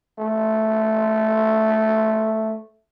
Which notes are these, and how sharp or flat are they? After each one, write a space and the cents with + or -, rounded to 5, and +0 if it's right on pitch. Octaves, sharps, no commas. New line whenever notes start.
A3 -5